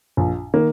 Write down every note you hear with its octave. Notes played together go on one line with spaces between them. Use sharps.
A#1
D#3 A#3